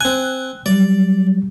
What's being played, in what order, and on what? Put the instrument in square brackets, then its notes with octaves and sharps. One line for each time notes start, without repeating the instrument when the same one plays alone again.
[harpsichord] C4 G#5 [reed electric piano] F#6
[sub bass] F#3 [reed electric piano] G3 [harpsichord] D5